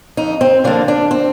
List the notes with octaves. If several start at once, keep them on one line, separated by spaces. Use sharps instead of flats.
F2 D#4
C4
D3 F3 A#3 D4
D4
C4